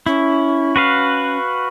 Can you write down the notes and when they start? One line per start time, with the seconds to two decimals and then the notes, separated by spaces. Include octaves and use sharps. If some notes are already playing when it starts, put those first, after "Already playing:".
0.06 C#4 E4
0.76 F#4 B4 F5